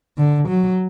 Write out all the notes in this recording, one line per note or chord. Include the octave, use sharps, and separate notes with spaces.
D3
F#3